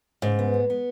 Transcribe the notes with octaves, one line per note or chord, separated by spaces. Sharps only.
G#2 C#3
B3
G#3
B3